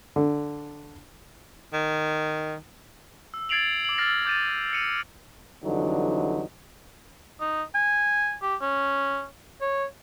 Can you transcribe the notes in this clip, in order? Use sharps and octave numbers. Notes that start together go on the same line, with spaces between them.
D3
D#3
E6
G#6 A6 C7 D7 F7 F#7
D6 F#7
E6 F6 A6 A#6 C7
D6 G6 A6 D#7
A6 C#7 D#7 F7
F2 D3 E3 F#3 G3 D#4
D#4
G#5
G4
C#4
C#5